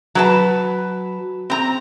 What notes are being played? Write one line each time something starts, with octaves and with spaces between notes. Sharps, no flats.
F#3 B4 A5
C4 A#5